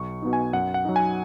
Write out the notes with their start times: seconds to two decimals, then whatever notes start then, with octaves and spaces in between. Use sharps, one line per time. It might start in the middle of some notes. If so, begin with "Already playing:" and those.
Already playing: B1 C#6
0.22 B2 B3 D#4
0.33 G#5
0.53 F#2 F#5
0.74 F#5
0.85 F#3 D#4
0.96 G#5